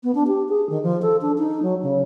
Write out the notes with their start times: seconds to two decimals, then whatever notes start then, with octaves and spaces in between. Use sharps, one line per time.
0.03 B3
0.15 D4
0.27 G4
0.49 G#4
0.69 D#3
0.83 F3
1.02 A4
1.21 D4
1.38 D#4
1.63 F#3
1.82 C#3